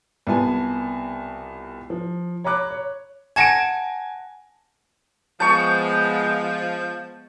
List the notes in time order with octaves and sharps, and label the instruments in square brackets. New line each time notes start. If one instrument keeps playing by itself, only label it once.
[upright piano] C2 B2 B3 F4 G#5 A5
F3
C#5 A#5 B5 D6 F#6
C#5
[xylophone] F#5 A5 G#6 [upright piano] G#5 A#6 D7
[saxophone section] F3 [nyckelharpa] G#3 B3 [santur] A5 C#6 [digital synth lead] G6